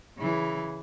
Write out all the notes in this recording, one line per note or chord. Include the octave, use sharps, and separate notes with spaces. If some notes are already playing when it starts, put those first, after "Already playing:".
C#3 E3